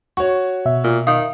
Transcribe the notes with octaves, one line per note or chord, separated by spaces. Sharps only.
F#4 C#5 C#6
B2 E5
A#2
D#3 F5 D#6